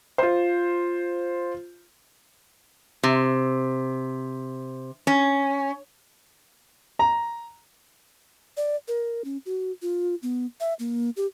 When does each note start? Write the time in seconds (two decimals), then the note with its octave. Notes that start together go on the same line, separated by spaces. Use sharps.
0.18 F4 C5
3.03 C3
5.07 C#4
6.99 A#5
8.57 D5
8.88 A#4
9.24 C#4
9.46 F#4
9.82 F4
10.23 B3
10.60 E5
10.79 A#3
11.17 G4